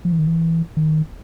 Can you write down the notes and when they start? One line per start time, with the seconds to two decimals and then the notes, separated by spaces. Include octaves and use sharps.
0.05 F3
0.12 E3
0.19 D#3
0.27 E3
0.77 D#3